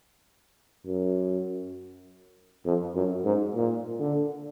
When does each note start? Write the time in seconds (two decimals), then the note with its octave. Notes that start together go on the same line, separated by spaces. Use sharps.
0.86 F#2
2.65 F2
2.95 F#2
3.25 G#2
3.54 A#2
4.00 D3